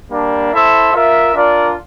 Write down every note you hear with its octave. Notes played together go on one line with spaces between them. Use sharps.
G3 A#3 D4
E4 A4 C5 E5
F4 A#4 E5
D4 F4 A#4 D5